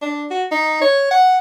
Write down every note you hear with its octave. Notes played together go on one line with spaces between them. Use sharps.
D4
F#4
D#4
C#5
F#5